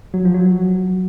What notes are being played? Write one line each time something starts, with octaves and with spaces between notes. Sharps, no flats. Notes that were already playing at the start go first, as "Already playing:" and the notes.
F#3
F3
F#3